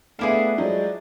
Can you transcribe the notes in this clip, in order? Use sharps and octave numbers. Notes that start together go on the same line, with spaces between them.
A3 B3 D4 E4 G#4 F5 D6
F3 F#3 G#3 D5